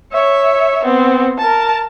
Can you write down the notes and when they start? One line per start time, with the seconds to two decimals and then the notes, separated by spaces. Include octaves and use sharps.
0.12 C#5 E5
0.85 B3 C4
1.38 A#4 A5